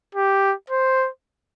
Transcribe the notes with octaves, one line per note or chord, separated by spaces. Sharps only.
G4
C5